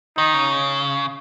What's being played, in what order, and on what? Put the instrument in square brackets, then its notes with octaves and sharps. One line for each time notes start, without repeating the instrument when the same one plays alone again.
[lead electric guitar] D#3 [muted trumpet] D#4
[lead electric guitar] C#3